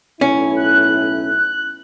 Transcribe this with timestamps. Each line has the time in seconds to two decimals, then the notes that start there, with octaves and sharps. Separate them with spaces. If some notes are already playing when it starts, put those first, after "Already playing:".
0.21 B1 A2 C#4 E4
0.56 F#6